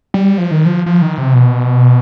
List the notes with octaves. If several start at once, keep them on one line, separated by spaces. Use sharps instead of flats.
G3
F3
D#3
F3
F3
D#3
C3
B2